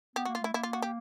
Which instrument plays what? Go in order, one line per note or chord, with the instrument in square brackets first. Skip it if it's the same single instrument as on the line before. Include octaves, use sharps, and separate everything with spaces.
[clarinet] B3 [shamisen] G4
[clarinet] A#3 [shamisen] F#4
[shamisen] F4
[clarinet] A3 [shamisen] E4
[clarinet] A#3 [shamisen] E4
[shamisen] F4
F#4
G4